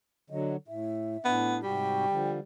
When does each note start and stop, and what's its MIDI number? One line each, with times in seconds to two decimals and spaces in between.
0.30 0.57 50
0.30 0.57 54
0.30 0.53 75
0.68 1.17 45
0.68 1.31 76
1.25 1.62 45
1.25 1.57 59
1.25 1.62 62
1.63 2.05 44
1.63 2.05 48
1.63 2.42 55
1.63 2.05 66
1.63 2.29 79
2.09 2.40 50
2.09 2.40 53